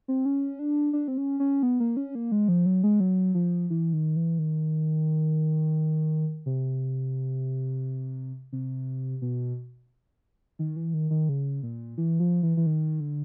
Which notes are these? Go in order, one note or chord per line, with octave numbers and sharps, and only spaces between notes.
C4
C#4
D4
D4
C4
C#4
C#4
B3
A#3
C#4
A#3
G#3
F3
F#3
G#3
F#3
F3
E3
D#3
E3
D#3
C3
C3
B2
D#3
E3
D#3
D#3
C#3
A#2
E3
F3
E3
E3
D#3
D3